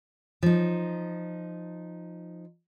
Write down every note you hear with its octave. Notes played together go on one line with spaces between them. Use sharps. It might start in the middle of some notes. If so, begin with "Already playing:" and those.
F3 D#4